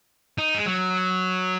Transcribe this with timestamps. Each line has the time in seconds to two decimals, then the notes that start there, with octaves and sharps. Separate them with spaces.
0.38 D#4
0.55 G#3
0.66 F#3